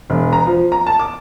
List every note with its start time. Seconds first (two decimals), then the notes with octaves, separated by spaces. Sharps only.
0.10 E1
0.33 A#5
0.46 F3
0.72 A#5
0.87 A5
0.99 D6